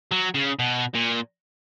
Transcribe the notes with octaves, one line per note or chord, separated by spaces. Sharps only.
F#3
C#3
B2
A#2